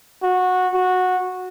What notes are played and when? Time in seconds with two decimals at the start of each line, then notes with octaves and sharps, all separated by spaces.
0.23 F#4
0.74 F#4